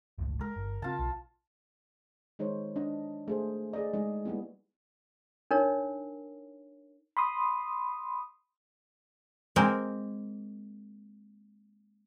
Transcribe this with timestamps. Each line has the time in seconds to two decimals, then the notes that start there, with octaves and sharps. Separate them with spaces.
0.18 G1 C#2 A2
0.41 G#3 A#4
0.56 G1
0.82 C#3 C4 F4 A5
0.99 B1
2.39 D#3 G#3 D#4 C5 C#5
2.76 D4 D#5
3.28 A3 G#4 C5
3.73 G#4 D5 D#5
3.94 G#3 D#4 G#4
4.25 G3 A#3 B3 E4
5.51 D4 D#4 A#4 C#5
7.17 B5 C6 D#6
9.56 G#3 A#3 C4 A#4